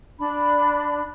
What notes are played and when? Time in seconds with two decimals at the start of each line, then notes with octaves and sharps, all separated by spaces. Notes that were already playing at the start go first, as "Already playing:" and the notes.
0.19 D4 B5